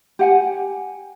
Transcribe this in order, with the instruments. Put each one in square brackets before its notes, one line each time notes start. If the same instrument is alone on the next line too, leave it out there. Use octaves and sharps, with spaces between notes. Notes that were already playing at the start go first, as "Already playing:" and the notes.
[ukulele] G4 F#5 G#5